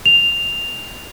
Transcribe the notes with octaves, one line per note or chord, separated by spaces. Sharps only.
F7